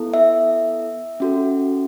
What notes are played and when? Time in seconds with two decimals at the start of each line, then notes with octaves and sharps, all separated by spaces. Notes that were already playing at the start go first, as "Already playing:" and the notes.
Already playing: B3 E4 A4
0.14 E5
1.20 C#4 F#4 A4